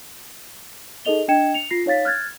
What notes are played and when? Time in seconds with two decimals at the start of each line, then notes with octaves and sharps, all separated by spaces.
1.05 D#4 G#4 A4 D#5 F7 G7
1.28 D4 D#5 G5 G#6 C#7 E7
1.54 C#7 F7
1.71 F4 A#6 C7
1.86 D#4 C#5 F5 A6 B6
2.05 F6 F#6 G#6 A6